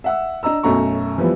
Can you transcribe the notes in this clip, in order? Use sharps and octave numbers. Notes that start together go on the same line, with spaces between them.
E5 F#5 E6
D4 D#5 A#5 E6
B1 F#2 A3 A#5 C#6
E3 F3 G3 B3